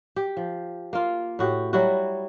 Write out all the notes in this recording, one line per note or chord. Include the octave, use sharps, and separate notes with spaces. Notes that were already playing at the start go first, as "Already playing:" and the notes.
G4
F3
A#3 F4
A2 F#4 G4
F#3 G3 E4 F#4